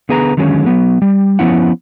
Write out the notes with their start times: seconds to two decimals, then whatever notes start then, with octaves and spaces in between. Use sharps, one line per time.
0.09 D3 B3 G#4 B4 A#5
0.37 D3 D#3 F#3 G#3 B3 C#4
0.66 F#3 B3
1.02 G3
1.39 F3 B3 C#4 E4 F#5